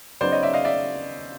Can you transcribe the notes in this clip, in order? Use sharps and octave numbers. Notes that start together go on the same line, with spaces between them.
C#3 F#3 B3 D#4 C5 D5
C#5 D#5
D5 E5
D#5 F5
D5 E5